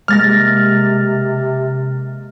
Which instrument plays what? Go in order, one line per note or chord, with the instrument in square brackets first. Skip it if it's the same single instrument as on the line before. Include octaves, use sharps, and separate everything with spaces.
[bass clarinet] C3 [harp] G#3 A#3 A#4 [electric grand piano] F6 A6 A#6